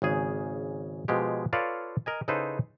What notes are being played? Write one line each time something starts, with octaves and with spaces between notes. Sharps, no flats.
G#1 C#3 G#4
B2 F3 G#3 G4
F4 A4 B4 C#5 D5 F5
A#4 D#5 G#5
C#3 D#4 E4 A4 B4 C5